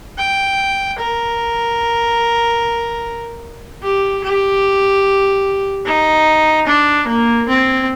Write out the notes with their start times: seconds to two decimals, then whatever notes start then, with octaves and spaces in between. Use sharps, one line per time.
0.18 G5
0.99 A#4
3.83 G4
4.23 G4
5.86 D#4
6.67 D4
7.07 A#3
7.48 C4